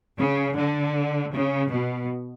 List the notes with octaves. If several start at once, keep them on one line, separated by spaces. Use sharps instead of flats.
C#3
D3
C#3
B2